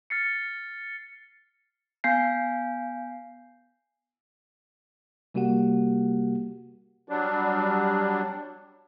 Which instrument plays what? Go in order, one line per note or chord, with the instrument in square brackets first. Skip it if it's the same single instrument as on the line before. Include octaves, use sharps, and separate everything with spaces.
[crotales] F6 A6 C7 C#7
[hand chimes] B3 F5 G#5 G6 C7
[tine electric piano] C3 G3 A#3 F#4 G4 F#5
[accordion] F#3 G3 D4